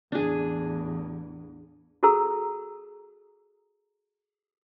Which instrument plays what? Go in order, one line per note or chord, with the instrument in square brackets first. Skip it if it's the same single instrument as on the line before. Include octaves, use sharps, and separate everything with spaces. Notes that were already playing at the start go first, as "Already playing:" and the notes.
[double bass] A1 E2 [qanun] D4 G#4
[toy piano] F#4 G#4 A4 A#5 E6